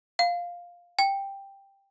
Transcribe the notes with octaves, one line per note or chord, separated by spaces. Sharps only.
F5
G5